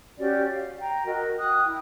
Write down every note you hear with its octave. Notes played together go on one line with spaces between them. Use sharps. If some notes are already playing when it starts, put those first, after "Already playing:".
C#4 F#4 G4 D5
F5
G5 A#5
F#4 A#4 D#5
G5 D#6 F#6
E4 G5